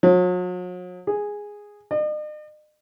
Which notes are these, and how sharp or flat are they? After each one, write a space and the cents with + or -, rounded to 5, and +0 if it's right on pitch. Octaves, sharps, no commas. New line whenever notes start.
F#3 -40
G#4 -5
D#5 -45